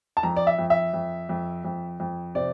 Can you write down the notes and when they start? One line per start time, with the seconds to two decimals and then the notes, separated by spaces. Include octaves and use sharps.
0.17 A5
0.23 F2 A#5
0.36 D5
0.47 E5
0.59 F2
0.70 E5
0.93 F2
1.29 F2
1.65 F2
2.00 F2
2.35 C3 D5